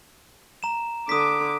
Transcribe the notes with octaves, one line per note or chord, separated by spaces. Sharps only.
A#5 E7
D3 D6 D#6 B6